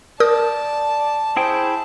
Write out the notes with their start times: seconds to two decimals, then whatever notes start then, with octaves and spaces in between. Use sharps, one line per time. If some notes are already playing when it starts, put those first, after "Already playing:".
0.20 A#4 D5 A5 D#6 G6
1.36 E4 G#4 C5 G5